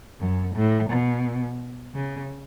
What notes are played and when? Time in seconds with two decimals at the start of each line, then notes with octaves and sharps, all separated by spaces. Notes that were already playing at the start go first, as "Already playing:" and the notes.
0.20 F#2
0.56 A2
0.90 B2
1.95 C#3